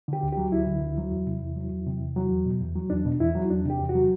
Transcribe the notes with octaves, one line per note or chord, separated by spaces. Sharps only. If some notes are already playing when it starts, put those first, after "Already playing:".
D3 G4
D2
F#3 G4
D2 E4
D3
D2
F#3
E2
C3
E2
F#3
E2
C3
E2
F#3
E2
B2
E2
F#3
E2 D4
B2
E2 E4
F#3
E2 D4
C3 G4
E2
F#4
F#3